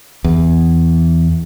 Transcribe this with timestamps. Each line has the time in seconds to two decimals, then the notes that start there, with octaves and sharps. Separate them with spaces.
0.24 E2